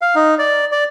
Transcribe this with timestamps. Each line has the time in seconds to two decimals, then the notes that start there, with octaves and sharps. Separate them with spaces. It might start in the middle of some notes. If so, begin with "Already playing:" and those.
0.02 F5
0.15 D#4
0.39 D5
0.72 D5